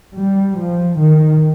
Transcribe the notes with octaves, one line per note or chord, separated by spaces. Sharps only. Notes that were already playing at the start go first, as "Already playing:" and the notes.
G3
F3
D#3